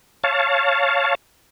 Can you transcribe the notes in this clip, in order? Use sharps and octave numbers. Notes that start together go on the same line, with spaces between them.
C#5 F5 A5